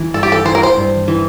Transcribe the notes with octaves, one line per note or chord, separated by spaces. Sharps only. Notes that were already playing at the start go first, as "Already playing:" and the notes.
Already playing: E3
G2 A4
G4
A4
E3 C5
A#4
C5
G2
E3